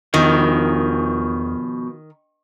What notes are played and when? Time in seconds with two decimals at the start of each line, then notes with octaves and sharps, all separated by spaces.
0.14 E2 B2 D#3 F3